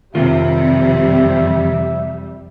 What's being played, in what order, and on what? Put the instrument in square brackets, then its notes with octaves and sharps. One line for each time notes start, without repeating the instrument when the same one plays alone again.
[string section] F2 G3 [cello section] C3 [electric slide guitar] D#3 F4 [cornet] E5